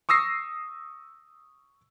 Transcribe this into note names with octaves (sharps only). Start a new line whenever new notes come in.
C#6 D#6 E6 A#6 C7